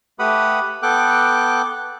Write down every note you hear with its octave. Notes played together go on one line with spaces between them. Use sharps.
A3 G4 B4 F#5 B5 D#6
B3 A4 G5 D6 F#6